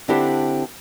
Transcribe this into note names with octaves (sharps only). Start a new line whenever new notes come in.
D3 C4 D4 E4 G4 C5